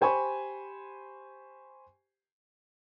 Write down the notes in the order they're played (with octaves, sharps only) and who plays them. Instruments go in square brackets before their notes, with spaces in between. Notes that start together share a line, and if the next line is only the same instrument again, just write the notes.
[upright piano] G4 C5 G#5 B5 C#6